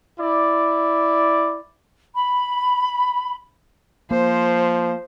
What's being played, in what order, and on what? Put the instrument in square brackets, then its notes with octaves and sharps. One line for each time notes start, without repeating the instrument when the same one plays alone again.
[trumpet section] E4 D5
[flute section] B5
[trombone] F3 [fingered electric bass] A#3 [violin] C5